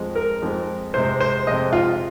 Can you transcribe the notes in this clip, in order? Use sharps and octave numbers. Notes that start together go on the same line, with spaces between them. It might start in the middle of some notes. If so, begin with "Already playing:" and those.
Already playing: F2 F3 G#3
A#4
F2 F3 G#3
F2 C3 G#3 C5
C5
F2 C3 G#3 D#5
F4